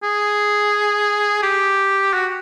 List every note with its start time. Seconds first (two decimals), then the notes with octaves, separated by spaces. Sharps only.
0.03 G#4
1.43 G4
2.14 F#4